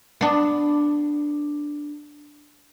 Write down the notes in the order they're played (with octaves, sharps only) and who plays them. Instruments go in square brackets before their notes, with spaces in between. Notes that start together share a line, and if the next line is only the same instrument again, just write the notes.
[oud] B3 D4